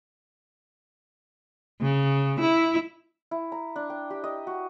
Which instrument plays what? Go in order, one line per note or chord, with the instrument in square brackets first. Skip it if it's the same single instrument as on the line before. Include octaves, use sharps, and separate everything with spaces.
[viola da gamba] C#3
E4
[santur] E4
A#5
D4
G5
G4
D#5
F#4